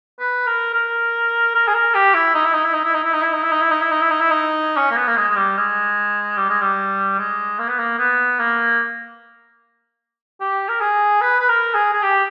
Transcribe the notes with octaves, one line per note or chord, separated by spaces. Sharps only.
B4
A#4
A#4
A#4
G#4
A#4
G4
E4
D#4
E4
D#4
E4
D#4
E4
D#4
E4
D#4
E4
D#4
E4
D#4
E4
D#4
E4
D#4
E4
D#4
E4
D#4
C#4
A#3
B3
A#3
G#3
G#3
G3
G#3
G3
G#3
G3
G#3
A#3
B3
A#3
B3
A#3
G4
A#4
G#4
B4
B4
A#4
G#4
G#4
G4